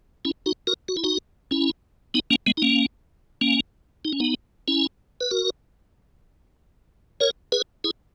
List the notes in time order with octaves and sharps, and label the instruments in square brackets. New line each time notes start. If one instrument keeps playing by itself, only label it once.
[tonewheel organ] C#4 E4
D#4 F#4
F#4 A#4
F#4
E4
D#4 F#4
C#4 E4
B3 D#4
A#3 C#4
G#3 B3
D#4
A#3 C#4
A#3 C#4
D#4
C#4
B3 D#4
C#4 E4
B4
F#4 A#4
A#4 C#5
G#4 B4
E4 G#4